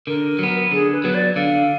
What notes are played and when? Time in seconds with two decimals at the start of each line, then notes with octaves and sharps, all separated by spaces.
0.07 D3 A#4
0.39 F#3 B3
0.72 D3 G#4
0.93 B4
1.04 F#3 B3 B4
1.15 D5
1.36 D3 F5